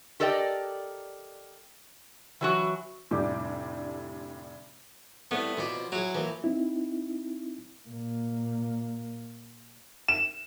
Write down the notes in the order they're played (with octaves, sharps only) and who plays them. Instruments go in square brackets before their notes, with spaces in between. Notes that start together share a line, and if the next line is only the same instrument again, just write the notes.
[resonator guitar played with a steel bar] G4 A4 A#4 D5 D#5 G5
E3 F#3 F#4
[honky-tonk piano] F1 A2 D3 G3 D6 G6
[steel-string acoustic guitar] G3 C4 E4 [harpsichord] A3 [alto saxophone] B3
[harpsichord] F2 B2 D5 [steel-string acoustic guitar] C5
[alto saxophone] F#3 [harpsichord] E4 G#4
[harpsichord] E3 [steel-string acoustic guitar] F3 A#3
[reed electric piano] C4 D#4 E4
[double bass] A#2 A#3
[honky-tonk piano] E7